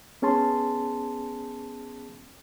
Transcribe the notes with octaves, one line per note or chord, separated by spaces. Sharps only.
B3 C#4 G#4 A5 C6